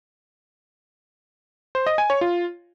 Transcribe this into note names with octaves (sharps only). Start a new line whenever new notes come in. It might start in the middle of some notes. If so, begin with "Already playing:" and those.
C5
D#5
G#5
C#5
F4